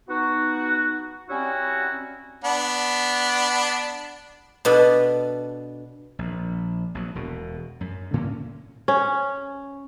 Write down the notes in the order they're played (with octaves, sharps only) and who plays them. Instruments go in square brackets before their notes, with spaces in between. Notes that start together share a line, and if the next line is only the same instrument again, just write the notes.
[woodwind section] B3 D#4 F#4
F#3 G3 C4 C#4 E4 F#4
[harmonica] B3 D4
[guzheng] B2 B3 D4 A4 A5 B5
[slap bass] A#1
A#1 F#3
E1 B2
F#2
A2 D3 A#3 C#4
[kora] C#4